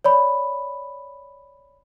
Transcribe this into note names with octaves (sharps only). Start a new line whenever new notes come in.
C#5 D5 B5